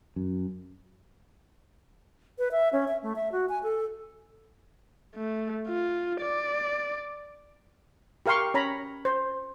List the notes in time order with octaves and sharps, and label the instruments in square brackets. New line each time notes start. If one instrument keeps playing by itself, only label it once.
[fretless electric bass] F#2
[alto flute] B4
E5
C#4
E5
A3
E5
F#4
G#5
A4
[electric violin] A3
F4
D5
[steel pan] G4 A#4 F5 G5 C6 C#6
C#4 C#5 A#5 B5
C5